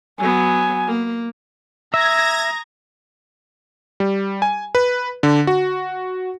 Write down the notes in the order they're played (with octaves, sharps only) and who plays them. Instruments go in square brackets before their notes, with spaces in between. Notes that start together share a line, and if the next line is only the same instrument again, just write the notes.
[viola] F#3 B3 [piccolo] G#5
[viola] A#3
[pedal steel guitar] E5 [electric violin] A#5 D#6 [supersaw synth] G#6 A#6
[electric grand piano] G3
G#5
B4
D3
F#4